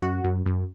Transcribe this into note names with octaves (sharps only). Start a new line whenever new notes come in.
F#2 F#4
F#2
F#2